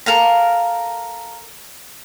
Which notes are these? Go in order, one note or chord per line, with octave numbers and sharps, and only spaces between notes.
A4 A#4 F5 A#5